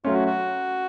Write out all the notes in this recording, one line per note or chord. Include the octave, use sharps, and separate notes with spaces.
F#3 A3 C#4 F4
F#4
F#4